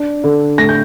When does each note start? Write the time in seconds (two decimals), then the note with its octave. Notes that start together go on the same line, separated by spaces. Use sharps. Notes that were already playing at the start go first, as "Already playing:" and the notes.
Already playing: D4 C7
0.24 D3
0.58 A2 A#6
0.69 G6